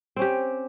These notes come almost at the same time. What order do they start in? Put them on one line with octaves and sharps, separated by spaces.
C4 C#4 G4